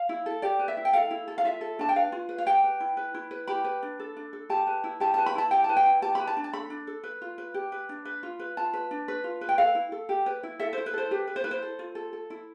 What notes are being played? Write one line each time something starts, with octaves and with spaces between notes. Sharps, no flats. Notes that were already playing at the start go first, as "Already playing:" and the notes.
Already playing: F5
E4
A4
G4 D5
B4
E5
E4
G5
A4 F5
E4
A4
F5
F4 E5
A4
D4 A5
G5
B4 F5
F4
B4
F5
G4 G5
B4
E4
B4
E4
B4
G4 B5
B4
D4
A4
D4
A4
G4 A5
B4
E4
G4 A5
B4 A5
B5
E4 A5
G4 G5
B4 A5
G5
E4
G4 A5
B4 B5
A5
D4
A5
A4 B5
D4
A4
B4
F4
B4
G4
B4
D4
B4
F4
B4
F4 A5
B4
D4
B4
F4
B4
G5
A4 F5
E4
A4
G4
B4
E4
A4 E5
E4 C5
B4
A4 C5
G4 B4
B4
C5
E4 B4
C5
A4
F4
A4
A4
E4